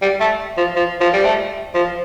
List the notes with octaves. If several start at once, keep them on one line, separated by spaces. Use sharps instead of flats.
G3
A3
F3
F3
F3
G3
A3
F3